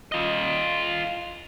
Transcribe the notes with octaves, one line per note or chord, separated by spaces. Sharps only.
F4 D#5